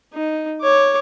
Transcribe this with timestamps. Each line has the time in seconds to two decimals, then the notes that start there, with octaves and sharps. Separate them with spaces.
0.13 D#4
0.61 C#5 D6